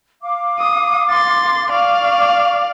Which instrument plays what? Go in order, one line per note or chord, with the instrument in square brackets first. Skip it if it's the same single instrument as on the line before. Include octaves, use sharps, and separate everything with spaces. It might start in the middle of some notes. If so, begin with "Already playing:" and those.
[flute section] F5 D6
[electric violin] D#6
C6 A6
[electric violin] D5 F5 [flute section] C#6 D6